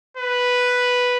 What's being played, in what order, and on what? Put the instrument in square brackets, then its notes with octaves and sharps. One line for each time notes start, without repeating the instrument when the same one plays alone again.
[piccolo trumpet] B4